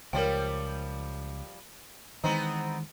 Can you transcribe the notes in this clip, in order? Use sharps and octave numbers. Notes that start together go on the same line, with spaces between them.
C#2 F3 G3 A#4 C#5 G5
D#3 E3 G#3 B3 C4 D#4